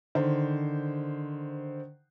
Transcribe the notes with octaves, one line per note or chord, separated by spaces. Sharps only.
D3 D#3 C5